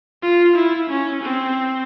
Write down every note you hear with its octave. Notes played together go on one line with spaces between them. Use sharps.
F4
E4
C#4
C4